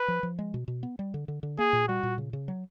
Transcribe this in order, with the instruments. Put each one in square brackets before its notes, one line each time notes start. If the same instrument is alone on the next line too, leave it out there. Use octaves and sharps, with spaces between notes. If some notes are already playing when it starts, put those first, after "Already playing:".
Already playing: [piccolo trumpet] B4
[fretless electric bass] F3
F3
G#3
B2
B2
B3
G3
D3
D3
D3
[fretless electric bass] A#3 [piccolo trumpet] G#4
[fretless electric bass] A#2
[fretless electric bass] G3 [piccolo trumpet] F#4
[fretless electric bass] A#2
C#3
C#3
F#3